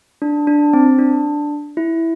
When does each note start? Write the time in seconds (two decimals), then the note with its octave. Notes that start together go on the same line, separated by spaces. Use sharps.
0.22 D4
0.47 D4
0.73 C4
0.99 D4
1.77 E4